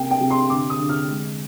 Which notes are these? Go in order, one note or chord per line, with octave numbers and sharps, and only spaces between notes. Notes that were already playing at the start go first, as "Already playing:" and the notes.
Already playing: C3 A#3 G5
G5
C3
C6
D3 D6
D#6
D3
F6
G#3